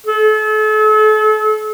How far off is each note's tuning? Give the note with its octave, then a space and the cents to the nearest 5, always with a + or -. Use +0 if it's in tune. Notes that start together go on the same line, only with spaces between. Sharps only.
A4 -40